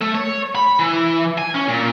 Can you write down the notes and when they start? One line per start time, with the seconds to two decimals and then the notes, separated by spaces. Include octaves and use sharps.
0.02 A3
0.15 C#5
0.55 B5
0.79 E3
1.38 G#5
1.55 C#4
1.68 A#2